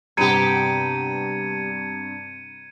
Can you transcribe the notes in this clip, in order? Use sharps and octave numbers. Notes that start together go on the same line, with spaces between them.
G2 C3 B3 G4 A#5 G#6 C#7 D#7